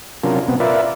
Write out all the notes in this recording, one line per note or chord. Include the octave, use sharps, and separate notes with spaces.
C3 F#3 C#4 D4 F4 A#4
B2 B3 C4
F4 A#4 B4 D5 E5